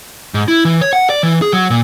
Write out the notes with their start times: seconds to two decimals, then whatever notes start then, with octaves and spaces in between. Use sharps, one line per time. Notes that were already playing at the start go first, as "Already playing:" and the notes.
0.34 G#2
0.48 E4
0.65 E3
0.81 C#5
0.93 F#5
1.10 D5
1.23 E3
1.42 G#4
1.53 F#3
1.70 A#2